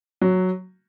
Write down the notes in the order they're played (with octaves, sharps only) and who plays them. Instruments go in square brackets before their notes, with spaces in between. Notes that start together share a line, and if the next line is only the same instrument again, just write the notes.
[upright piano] F#3